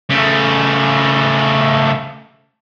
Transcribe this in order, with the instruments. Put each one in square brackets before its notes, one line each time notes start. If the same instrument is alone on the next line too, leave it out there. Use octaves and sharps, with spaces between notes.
[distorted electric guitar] C#3 A3